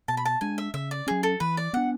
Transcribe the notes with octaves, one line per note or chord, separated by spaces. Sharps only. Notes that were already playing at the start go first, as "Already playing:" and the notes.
B2 A5
B5
A5
G#3 D4 G#5
E5
C#3 E5
D5
F#3 C#4 G#4
A4
E3 B4
D5
B3 D4 F#5